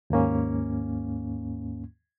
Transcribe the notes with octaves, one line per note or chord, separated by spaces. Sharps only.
D#2 G#2 A#3 C#4